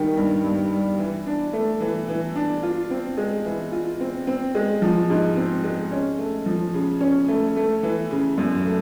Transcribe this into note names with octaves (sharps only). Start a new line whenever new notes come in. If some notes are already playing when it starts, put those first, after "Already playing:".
Already playing: D#3 G3
G2
G2
G3
E3
D4
A3
E3
E3
D4
F4
C4
G#3
E3
F4
C4
C4
G#3
F3
G#2
C4
G#3
C#4
A3
F3
C#3
C#4
A3
A3
E3
C#3
F#2
A3